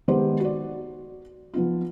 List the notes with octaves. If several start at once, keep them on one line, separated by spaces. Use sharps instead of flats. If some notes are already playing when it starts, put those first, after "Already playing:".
D#3 G#3 B3 G4 G#4 C5
F#4 D5
F3 B3 D#4 F4